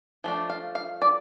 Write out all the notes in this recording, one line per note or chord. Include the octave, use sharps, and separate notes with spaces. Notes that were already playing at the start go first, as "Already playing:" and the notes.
F3 A3 D4
F5
F5
D5